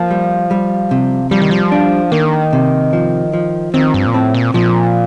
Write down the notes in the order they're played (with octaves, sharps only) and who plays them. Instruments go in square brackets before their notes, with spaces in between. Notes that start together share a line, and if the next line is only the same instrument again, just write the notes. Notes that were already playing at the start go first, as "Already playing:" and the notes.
Already playing: [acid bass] F3 [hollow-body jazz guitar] A#3
[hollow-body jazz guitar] G3
G3
C3
[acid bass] F3 [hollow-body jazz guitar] G3
[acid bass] D#3
F3
[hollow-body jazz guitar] D4
[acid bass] D#3 [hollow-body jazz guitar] A#3
[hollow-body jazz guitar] C3
F3
F3
[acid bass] D#3 [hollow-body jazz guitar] C4
[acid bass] G2
A#2
[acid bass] A2 [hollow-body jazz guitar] C4
[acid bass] A#2
[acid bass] A#2 [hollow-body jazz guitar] F3